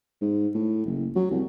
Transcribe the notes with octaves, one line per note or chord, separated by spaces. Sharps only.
G#2
A2
F#1
F#3
C2